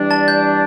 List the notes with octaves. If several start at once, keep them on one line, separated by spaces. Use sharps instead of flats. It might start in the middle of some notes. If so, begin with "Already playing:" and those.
Already playing: E3 G3 D4
A5 A6
G6